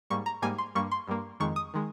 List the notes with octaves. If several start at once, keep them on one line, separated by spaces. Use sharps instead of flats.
G#2 G3 A#3 C#6
A#5
G#2 G3 A#3 G#5
C6
G2 G3 A#3 C#6
C6
G2 G3 A#3
F2 D#3 G#3 C#6
D#6
D#3 G#3